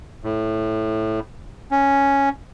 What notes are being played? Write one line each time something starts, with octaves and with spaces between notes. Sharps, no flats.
A2
C#4